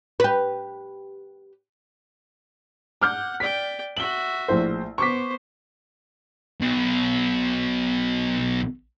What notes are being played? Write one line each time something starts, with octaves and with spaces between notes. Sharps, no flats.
G4 B4
F#5 D6 F6 G6
D5 G5 B6
F#4 E5 F#7 G7
A#1 A2 C5
B3 C5 C#6 D6 B6
B1 B2